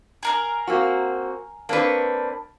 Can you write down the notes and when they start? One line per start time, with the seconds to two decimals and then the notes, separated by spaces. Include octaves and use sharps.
0.23 G#4 A#4 A#5
0.67 A#3 C4 F#4
1.69 A#3 C4 D4 B4 C#6